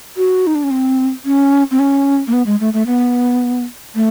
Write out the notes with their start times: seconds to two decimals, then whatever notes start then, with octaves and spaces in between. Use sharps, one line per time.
0.17 F#4
0.47 D#4
0.55 D4
0.63 C#4
0.71 C4
1.25 C#4
1.71 C4
1.79 C#4
2.27 A#3
2.33 B3
2.46 G#3
2.60 A3
2.73 A3
2.87 B3
3.95 A3